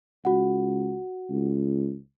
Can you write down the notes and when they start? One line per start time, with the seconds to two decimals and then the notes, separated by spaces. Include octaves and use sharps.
0.25 C#2 F#4 F#5
1.29 C#2